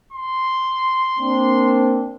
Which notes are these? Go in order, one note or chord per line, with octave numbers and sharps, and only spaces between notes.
C6
A#3 C4 D4